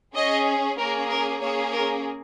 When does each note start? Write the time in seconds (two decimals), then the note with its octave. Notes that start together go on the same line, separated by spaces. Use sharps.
0.15 C#4 G#4 D#5
0.78 A#3 C#4 G#4 A#4
1.09 A#4
1.41 A#3 C#4 G#4 C#5
1.73 A#4